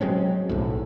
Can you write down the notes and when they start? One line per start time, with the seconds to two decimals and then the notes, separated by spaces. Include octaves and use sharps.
0.01 F#3 G#3 C4 C#4
0.49 B1 E2 A2